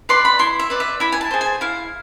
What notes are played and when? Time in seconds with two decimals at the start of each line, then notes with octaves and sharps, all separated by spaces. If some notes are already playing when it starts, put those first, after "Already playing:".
0.09 B4 D5 C6
0.25 B5
0.39 E4 C6
0.60 E5
0.70 B4 D5
0.80 E5
1.00 E4 B5
1.12 G#5
1.21 A5
1.31 G#4 C5
1.41 G#5
1.61 E4 F5